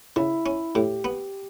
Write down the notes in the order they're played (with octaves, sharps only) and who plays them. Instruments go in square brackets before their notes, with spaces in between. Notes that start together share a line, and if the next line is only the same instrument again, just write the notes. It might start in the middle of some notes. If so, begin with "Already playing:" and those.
[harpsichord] C#3 [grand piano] E4
[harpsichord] C#4
[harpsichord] A2 [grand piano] G4
[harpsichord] B3